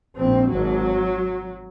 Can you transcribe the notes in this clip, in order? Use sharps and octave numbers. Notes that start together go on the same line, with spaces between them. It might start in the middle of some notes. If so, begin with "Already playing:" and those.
A#1 G#2 C4
G#1 G#2 F#3